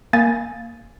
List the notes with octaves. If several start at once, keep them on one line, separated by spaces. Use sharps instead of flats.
A#3 G#5 A6